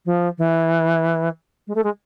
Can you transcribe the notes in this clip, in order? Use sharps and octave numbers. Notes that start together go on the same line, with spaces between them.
F3
E3
G#3
A3
G#3